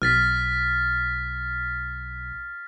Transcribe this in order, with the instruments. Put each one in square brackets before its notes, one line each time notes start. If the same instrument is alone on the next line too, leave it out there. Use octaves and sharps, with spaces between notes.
[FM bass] B1 [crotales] F6 A6 B6